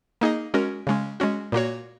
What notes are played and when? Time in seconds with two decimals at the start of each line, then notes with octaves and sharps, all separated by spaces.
0.21 A#3 D#4 G#4 D#5
0.54 G#3 C#4 F#4 A#4
0.87 C#3 G#3 C#4
1.20 G#3 C#4 F#4
1.52 A#2 A#3 F#4 C#5